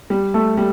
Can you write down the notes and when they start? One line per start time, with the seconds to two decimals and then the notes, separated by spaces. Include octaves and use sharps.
0.10 G3
0.34 A3
0.57 G3